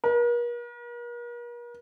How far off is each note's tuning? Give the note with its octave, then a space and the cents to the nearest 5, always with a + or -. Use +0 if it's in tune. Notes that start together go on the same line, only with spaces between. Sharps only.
A#4 +45